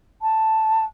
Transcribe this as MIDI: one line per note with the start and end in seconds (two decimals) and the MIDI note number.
0.22 0.84 81